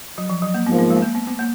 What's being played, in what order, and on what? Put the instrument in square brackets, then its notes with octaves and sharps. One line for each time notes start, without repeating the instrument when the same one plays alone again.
[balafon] F#3
F3
F#3
A#3
[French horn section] G#2 F3 A#3 [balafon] B3
[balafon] B3
G#3
B3
A#3
B3
B3
A#3